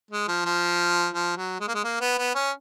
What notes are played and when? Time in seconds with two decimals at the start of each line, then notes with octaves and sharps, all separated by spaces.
0.11 G#3
0.28 F3
0.45 F3
1.14 F3
1.37 F#3
1.60 G#3
1.68 A#3
1.74 G#3
1.84 A#3
2.01 B3
2.18 B3
2.35 C#4